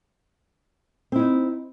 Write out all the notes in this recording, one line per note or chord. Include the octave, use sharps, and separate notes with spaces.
C4 D#4 E4